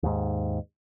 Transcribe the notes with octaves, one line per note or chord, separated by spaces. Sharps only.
D#2 G#2